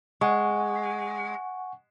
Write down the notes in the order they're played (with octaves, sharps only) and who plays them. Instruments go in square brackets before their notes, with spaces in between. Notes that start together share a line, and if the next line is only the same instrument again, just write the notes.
[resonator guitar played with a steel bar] G#3 [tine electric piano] F#5 G#5 C#6